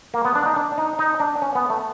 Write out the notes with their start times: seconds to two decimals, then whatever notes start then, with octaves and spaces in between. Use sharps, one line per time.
0.14 A#3
0.25 B3
0.35 D4
0.46 D#4
0.56 D4
0.78 D#4
0.99 D#4
1.20 D4
1.42 C#4
1.55 B3
1.70 A3